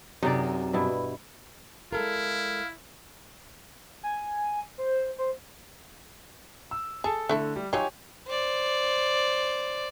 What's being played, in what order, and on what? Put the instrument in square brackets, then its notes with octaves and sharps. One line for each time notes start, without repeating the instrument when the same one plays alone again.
[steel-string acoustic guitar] F#2 C3 [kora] D#4 G#4 D5
[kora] G2 B2 E4
[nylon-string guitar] G#3 A4 A#4 [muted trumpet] E4 [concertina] F5
[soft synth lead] G#5
C5
C5
[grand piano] E6
[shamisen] G#4 [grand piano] A4 A5
[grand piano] D3 [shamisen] A3 E4 A4
[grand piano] G3
[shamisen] F#3 D#4 F4 [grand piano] G4 C#5 G#5
[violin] C5 D5